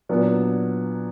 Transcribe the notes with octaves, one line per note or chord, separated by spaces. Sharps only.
A#2 F#3 B3 D4